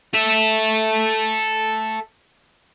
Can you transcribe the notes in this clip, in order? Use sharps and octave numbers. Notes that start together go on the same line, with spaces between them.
A4 E5